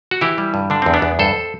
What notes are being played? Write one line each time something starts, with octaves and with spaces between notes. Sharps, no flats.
F#4
E3 E4 G4
G3
G2
D3 D4
E2 C4
B3 D4
E2
G2 A4 C5